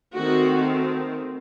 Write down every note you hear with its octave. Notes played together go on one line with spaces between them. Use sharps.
D#3 A3 C4 F#4